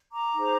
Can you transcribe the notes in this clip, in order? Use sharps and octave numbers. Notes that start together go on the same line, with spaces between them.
A#5 D6
D#4 G#4 C5